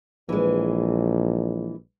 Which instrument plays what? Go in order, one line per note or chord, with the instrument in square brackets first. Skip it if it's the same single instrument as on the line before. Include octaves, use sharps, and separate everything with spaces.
[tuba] A#1 [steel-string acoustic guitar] E3 G#3